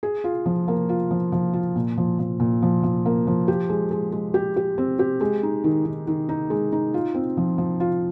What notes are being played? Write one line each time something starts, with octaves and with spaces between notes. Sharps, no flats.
G#4
F4
F3
A#3
F4
F3
F3
F4
A#2
F3
F3
A#2
F3
F3
A#3
F3
G4
G#3
G#3
G#3
G4
G4
C4
G4
G#3
D#4
D#3
D#3
D#3
D#4
G#3
D#4
F4
C4
F3
F3
F4